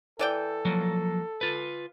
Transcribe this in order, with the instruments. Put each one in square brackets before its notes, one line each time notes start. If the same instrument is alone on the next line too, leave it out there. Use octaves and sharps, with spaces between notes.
[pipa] E3 D5 G5 [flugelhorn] A4
[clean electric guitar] F3 F#3 A#3
F4 B4